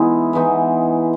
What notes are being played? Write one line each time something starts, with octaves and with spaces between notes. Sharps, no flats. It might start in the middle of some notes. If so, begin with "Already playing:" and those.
Already playing: E3 G#3 B3 D#4 E4
E3 G#3 B3 D#4